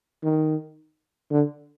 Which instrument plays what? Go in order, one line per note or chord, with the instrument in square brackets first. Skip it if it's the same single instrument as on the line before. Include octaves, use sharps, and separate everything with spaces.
[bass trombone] D#3
D3